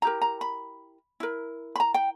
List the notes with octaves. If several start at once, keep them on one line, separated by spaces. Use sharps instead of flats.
E4 G4 A#4 A#5
A#5
B5
E4 A#4
B5
A#5
G5